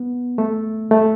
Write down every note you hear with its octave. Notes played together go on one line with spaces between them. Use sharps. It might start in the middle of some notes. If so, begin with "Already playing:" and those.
Already playing: B3
A3
A3